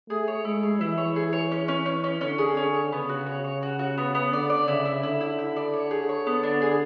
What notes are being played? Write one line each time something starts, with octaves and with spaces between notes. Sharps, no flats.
A3 G#4
C#5
G#3 E4
G#4
E3 E4
C#5
G#4
C#5
C#4
C#4
C#4
C#4
D3 C#4
G#4
C#4
C#5
C#3 B3
F#4
C#5
C#5
F#4
F#4
B3
B3
D3 D5
D5
C#3 E4
E4
D3 E4
E4
E4
D5
C#5
G#4
C#5
B3
D4
G#4